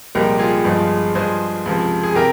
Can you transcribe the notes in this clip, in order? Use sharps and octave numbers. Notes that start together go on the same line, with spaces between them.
C2 A#2 F3 G#3 G4 A#4
F4 G#4
G1 G2 F3 G#3
G2 F3 G#3 G#4 C5
C#2 C3 F3
G#4
C3 G4 A#4